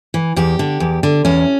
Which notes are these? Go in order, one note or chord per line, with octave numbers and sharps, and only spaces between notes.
E3
E2 G4
D3
E2
D3
E2 C#4